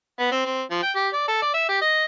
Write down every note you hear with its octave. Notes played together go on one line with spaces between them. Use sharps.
B3
C4
C4
F3
G5
G4
D5
A4
D5
E5
G4
D#5